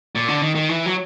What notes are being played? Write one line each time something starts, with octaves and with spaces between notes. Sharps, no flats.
A#2
D3
D#3
D#3
E3
F#3